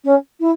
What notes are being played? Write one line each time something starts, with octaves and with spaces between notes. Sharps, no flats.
C#4
E4